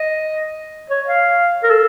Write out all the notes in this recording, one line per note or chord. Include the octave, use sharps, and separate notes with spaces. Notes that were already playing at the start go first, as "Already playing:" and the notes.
Already playing: D#5
C#5
F5
A#4
A4